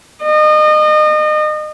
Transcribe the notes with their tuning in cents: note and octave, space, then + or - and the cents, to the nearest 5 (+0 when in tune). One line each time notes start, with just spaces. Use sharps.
D#5 -30